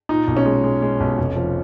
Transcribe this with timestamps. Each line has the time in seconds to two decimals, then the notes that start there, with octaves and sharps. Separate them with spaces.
0.09 A#2 D#4
0.28 B1
0.37 C#4
0.46 G#3
0.64 G#3
0.82 G#3
1.00 B1
1.18 F1
1.36 F3